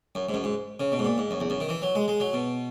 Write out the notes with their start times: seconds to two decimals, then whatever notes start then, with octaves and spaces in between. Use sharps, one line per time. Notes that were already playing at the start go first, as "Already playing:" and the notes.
0.15 F#2
0.29 G#2
0.34 F#2
0.44 G#2
0.80 C#3
0.92 B2
0.99 G#2
1.05 A#2
1.18 G#2
1.31 F#2
1.40 E2
1.50 F#2
1.60 D#3
1.69 E3
1.82 F#3
1.95 G#3
2.08 G#3
2.20 F#3
2.33 B2